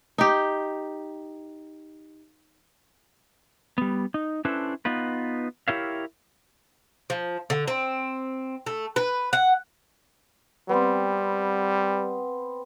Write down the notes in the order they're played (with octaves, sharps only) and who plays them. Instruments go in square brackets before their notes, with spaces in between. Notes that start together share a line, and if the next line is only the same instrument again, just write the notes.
[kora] D#4 G4
[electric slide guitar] G3 B3
D#4
C#4 D4 E4 A4 B4 C5
B3 D#4 F4 B4
E4 G4 A#4 C#5 E5 F5
[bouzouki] F3
D3
C4
A3
B4
F#5
[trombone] G3 [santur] B3 C4